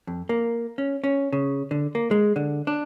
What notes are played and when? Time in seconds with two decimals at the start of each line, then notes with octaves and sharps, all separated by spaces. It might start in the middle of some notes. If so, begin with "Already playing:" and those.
0.07 F2
0.29 A#3
0.78 C#4
1.04 C#4
1.32 C#3
1.71 D3
1.95 A#3
2.11 G#3
2.36 D3
2.67 D4